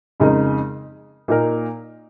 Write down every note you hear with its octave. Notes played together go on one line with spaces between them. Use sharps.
F2 C#3 G#3 D#4 A#4
A#2 A#3 D#4 A#4